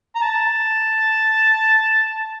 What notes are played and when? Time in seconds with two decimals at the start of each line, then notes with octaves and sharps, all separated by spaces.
0.15 A#5
0.22 A5